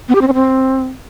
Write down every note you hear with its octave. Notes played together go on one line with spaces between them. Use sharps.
B3
G4
C4
C#4
C4